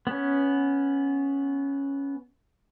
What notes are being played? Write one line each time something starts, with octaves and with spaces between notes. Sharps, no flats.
B3 C#4